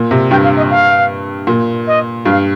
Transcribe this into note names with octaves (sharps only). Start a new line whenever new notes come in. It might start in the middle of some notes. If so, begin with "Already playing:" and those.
Already playing: A#2
C3
G2 G5
F5
D#5
F5
A#2
D#5
G2 F5